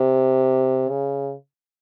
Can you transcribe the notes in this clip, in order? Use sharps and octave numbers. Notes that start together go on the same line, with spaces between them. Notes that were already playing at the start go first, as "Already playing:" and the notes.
Already playing: C3
C#3